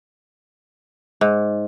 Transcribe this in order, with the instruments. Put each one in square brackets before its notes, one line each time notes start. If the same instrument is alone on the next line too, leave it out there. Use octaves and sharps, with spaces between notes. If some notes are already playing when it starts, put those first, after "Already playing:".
[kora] G#2